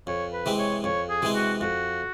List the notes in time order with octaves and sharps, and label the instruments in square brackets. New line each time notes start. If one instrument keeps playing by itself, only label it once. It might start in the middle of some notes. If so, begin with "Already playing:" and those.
[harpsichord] F2 [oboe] C#5
[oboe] B4
[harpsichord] C3 E3 G#3 C4
[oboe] C#5
[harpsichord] F2 [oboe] C#5
[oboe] G#4
[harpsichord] C3 E3 G#3 C4
[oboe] F#4
[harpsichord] F2 [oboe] F#4